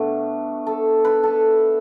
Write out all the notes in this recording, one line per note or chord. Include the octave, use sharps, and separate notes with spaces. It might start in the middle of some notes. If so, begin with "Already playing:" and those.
Already playing: B2 A3 D4
A4
B4
A4